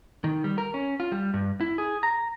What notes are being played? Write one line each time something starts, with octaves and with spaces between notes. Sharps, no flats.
D#3
G3
A#4
C#4
F4
G3
G2
E4
G#4
A#5